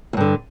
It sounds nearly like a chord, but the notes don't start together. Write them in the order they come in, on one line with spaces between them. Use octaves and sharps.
E2 G2 D3